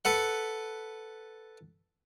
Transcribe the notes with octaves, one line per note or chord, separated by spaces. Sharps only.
A4 B4 F#5